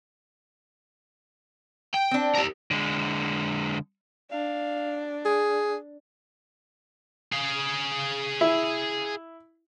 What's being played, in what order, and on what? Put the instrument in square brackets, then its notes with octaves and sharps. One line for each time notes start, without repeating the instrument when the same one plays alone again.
[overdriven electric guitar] G5
[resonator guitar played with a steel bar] C4 D4
[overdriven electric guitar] G4 A#4
[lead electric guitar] D3 G#3
[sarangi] D4 [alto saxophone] F5
[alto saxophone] G#4
[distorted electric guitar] G#4 F5
[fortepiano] E4